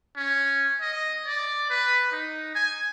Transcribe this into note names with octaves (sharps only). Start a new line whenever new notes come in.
C#4
D#5
D5
B4
D#4
G#5